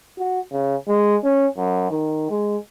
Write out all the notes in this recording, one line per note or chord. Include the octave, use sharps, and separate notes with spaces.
F#4
C#3
G#3
C#4
F#2
D#3
G#3